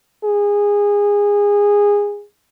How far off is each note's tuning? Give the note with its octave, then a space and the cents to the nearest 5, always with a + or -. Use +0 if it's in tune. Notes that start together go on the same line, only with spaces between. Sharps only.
G#4 -20